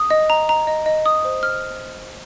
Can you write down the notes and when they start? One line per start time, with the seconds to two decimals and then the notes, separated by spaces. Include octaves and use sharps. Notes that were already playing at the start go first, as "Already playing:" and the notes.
Already playing: D#6
0.10 D#5
0.30 A#5
0.49 A#5
0.67 D#5
0.86 D#5
1.06 D#6
1.25 C5
1.43 F6